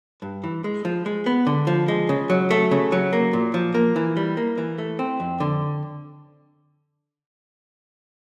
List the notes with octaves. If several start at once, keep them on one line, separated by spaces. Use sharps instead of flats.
G2
E3
G#3
F3
G#3
B3
D3
F3
G#3
C#3
F#3
A3
C#3
F#3
A#3
A#2
F3
A#3
E3
G3
A#3
E3
A3
C4
F2
D3